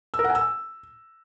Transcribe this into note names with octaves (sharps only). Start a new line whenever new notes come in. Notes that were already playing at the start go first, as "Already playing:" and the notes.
E6
A#4
F#5
G#5
E6